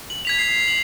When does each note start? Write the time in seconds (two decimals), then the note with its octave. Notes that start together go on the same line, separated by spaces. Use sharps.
0.10 F#7
0.25 G#6 B6 F7
0.38 C7
0.68 F#7